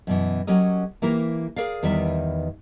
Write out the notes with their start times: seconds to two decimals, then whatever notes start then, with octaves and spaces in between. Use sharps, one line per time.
0.07 F#2 B2 E3
0.47 F#3 C#4 G4 A#4 D#5
1.02 E3 A#3 E4 G4 A#4
1.56 G#4 A#4 D5 F5
1.83 E2 D#3 G3 B4 E5